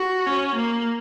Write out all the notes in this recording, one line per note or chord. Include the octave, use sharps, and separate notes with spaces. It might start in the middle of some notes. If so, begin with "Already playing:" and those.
Already playing: F#4
C#4
A#3